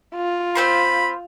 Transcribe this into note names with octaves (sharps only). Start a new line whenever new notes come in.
F4
C4 C5 B5 C6